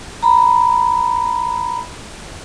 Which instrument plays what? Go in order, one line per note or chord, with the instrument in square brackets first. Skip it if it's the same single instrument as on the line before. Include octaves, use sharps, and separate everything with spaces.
[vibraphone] A#5 B5